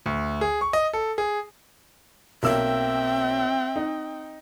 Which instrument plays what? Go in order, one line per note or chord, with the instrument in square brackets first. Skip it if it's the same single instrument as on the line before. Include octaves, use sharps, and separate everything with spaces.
[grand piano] D2
G#4
C#6
D#5
A4
G#4
[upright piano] B1 A#3 E6 [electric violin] C4 G5 [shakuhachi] E5
[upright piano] D#4